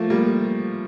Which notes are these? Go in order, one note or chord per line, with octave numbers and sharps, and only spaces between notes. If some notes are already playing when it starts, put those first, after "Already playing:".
Already playing: F3 A3 A#3
G3 A#3